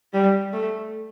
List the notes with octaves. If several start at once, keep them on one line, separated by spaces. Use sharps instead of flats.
G3
A3